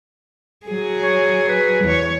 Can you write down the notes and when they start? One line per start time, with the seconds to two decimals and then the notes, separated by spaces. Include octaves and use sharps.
0.67 F#3 G#4
1.02 C#5
1.49 B4
1.84 E2 C#5